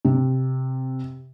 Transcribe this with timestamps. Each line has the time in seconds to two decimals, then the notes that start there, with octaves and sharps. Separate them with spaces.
0.05 C3